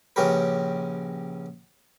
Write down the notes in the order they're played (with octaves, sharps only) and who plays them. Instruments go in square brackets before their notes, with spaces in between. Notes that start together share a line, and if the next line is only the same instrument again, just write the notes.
[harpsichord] A#1 C#3 C#4 G4 A#4 B4